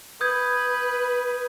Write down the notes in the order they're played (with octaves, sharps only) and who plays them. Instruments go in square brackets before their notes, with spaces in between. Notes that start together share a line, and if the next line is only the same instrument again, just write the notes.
[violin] B4 [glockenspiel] D#6 G6 G#6